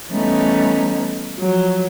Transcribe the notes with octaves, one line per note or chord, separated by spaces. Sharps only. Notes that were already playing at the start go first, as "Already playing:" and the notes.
E3 G3 A3 B3 C#4 D#4
F3 F#3